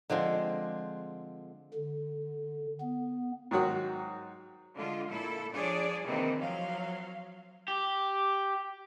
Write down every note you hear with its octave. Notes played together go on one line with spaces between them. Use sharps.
D3 F3 G#3 C4
D3
B3
G#2 D#3 F#3 F#4
D3 G#3 F4
A#2 E4 A4
F3 D4 G#4 C#5 D5
C3 D#3 E3 A#3 C4
F3 F#3 F5
G4